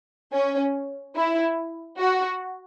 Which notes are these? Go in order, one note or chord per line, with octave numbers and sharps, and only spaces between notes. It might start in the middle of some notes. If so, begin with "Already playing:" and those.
C#4
E4
F#4